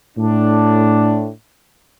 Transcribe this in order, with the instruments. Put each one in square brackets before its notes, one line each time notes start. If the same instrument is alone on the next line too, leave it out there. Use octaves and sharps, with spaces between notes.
[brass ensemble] A2 D4